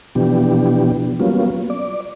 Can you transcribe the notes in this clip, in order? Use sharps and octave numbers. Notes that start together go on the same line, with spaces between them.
B2 E3 F3 B3 D4 G4
F#3 G3 A#3 B3 C#4 F4
D5